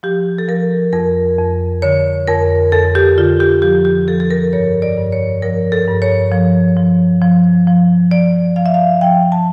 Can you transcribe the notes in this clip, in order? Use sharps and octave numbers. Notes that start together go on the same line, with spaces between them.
F3 G4
A4
F3 A#4
F2 A#4
F2
D3 C#5
F2 A#4
F2 A4
G4
D3 F4
G4
F3 G4
G4
F3 A4
A4
A#4
G2 C#5
D5
G2
C#5
F3 A#4
A4
G2
C#5
F3
F3
F3
F3
F3 D5
F3 F5
E5
F5
F3 G5
A5